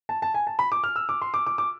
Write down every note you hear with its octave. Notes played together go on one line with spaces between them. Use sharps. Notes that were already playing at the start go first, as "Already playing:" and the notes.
A5
A5
G#5
A5
B5
D6
F6
E6
D6
C6
D6
D6
D6